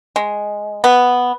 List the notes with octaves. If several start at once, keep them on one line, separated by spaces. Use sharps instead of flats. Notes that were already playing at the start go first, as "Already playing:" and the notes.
G#3
B3